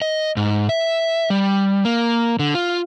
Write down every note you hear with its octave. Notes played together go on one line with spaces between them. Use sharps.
D#5
G#2
E5
G3
A#3
D3
F4